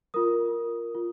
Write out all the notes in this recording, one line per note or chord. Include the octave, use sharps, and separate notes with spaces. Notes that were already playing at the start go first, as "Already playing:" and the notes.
F4 A#4 D#6
F4